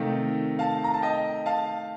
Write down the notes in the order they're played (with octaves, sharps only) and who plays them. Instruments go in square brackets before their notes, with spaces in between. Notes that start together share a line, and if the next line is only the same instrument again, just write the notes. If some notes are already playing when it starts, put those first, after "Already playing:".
Already playing: [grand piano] C3 D#3 A3 D#4 F5
F5 A5
A#5
A5
D#5 G5
F5 A5